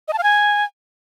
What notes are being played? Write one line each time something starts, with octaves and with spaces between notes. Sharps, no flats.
D#5
A5
F5
G#5